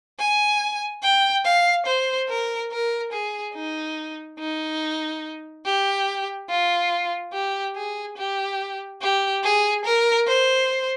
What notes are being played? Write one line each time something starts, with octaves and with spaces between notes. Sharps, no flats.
G#5
G5
F5
C5
A#4
A#4
G#4
D#4
D#4
G4
F4
G4
G#4
G4
G4
G#4
A#4
C5